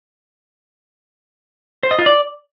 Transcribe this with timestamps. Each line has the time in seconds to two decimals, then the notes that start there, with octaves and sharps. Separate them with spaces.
1.83 C5
1.91 D#5
1.99 F4
2.06 D5